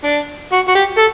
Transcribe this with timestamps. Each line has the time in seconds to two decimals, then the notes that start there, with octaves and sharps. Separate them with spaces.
0.04 D4
0.52 F#4
0.68 F#4
0.75 G4
0.97 A4